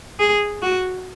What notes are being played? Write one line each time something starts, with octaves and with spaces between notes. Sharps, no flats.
G#4
F#4